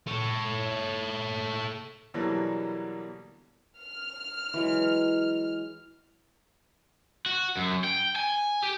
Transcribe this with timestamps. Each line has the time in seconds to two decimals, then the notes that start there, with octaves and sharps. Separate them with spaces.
0.07 A4 C#5
2.14 B2 D3 E3 F#3 G3 A#3
3.78 F6
4.54 E3 F#3 G#3
7.26 F#4
7.57 F#2
7.84 G5
8.16 G#5
8.62 G4